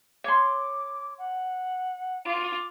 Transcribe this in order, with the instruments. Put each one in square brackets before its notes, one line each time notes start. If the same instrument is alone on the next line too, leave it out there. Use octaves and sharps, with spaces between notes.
[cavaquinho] C#5 C6 [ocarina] D6
[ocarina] F#5
[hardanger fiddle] F4 [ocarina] D6